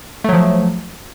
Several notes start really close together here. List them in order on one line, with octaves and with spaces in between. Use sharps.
A3 F#3 F3